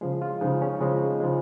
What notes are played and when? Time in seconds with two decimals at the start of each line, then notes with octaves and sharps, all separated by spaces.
0.01 C#3 F3 G#3 G#4
0.22 F4
0.41 C#3 F3 G#3 D#4
0.62 C#4
0.81 C#3 F3 G#3 D#4
1.21 C#3 F3 G#3